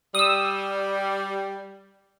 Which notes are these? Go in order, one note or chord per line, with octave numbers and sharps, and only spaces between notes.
G3 D#6 E6